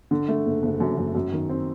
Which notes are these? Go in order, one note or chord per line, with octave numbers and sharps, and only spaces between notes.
D3
A3
F#1
F#1
F#2
F#2
F#2
D#3
C4